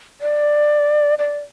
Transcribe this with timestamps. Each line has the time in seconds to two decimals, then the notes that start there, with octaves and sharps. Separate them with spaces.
0.21 D5
1.19 D5